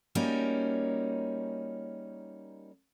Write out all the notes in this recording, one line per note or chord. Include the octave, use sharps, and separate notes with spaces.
G3 A#3 C#4 D#4 F#4